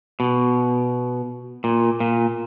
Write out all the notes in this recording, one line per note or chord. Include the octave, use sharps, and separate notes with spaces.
B2
A#2
A#2